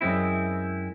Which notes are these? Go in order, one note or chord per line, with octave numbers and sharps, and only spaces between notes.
F#2 G#3 C4 E4